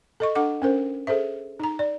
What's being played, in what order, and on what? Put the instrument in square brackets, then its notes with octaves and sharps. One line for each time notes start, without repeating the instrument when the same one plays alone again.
[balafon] A4 D#5 C#6
D4 A4 F#5 D6
C#4 A#4 C5
G#4 A4 C5 E5
D#4 A#5
D5